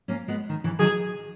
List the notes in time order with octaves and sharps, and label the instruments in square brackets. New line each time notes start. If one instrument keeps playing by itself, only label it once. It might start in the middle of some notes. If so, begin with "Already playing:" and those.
[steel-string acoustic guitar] A#3 C#4
G#3 B3
D#3
C#3 E3
[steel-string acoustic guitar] D#3 F#3 [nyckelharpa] G#4